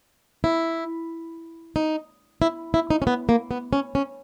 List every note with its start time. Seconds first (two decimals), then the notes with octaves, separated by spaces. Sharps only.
0.44 E4
1.76 D#4
2.42 E4
2.74 E4
2.90 D#4
3.02 C#4
3.07 B3
3.29 A#3
3.51 B3
3.73 C#4
3.95 C#4